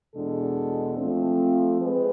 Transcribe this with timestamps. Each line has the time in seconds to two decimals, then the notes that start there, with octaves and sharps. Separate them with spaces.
0.15 E2 B2 G#3 D4 A4
0.97 F3 A3 C4
1.79 G#3 C4 G#4 B4